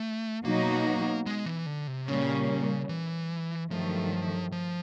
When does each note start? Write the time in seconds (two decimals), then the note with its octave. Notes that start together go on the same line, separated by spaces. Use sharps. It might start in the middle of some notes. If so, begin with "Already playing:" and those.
Already playing: A3
0.45 B2 F#3 A#3 B3 D#4 F#4
1.26 G#3
1.46 E3
1.66 D3
1.87 C3
2.07 A#2 C#3 G3 A#3 C#4
2.89 E3
3.71 G2 D#3 F3 F#3 A3
4.52 F3